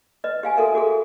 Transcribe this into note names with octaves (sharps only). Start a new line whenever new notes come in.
B4 D#5
G4 F5 G#5
F#4 A4 A#4 E5
F#4 G#4 A4